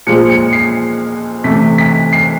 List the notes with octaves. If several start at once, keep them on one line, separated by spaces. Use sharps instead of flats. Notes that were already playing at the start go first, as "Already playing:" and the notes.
A#2 F3 G#3 C#7
C#7
C7
C3 E3 A3 B6
B6
C7